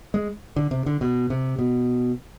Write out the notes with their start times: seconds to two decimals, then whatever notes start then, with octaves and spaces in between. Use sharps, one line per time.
0.14 G#3
0.56 D3
0.71 C3
0.86 D3
1.01 B2
1.30 C3
1.59 B2